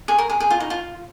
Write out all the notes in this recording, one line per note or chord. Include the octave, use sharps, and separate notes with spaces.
G#4
A#4
G#4
G#4
F4
D#4
F4